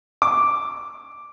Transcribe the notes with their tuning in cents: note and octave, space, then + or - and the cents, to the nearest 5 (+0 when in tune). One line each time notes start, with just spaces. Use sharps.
D6 -5